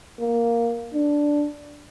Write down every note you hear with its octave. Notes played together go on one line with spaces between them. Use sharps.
A#3
D4